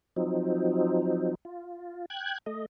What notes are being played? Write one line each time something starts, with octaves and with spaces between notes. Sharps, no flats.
F3 F#3 C4 D#4
F4
G5 F#6 G#6
A3 D#5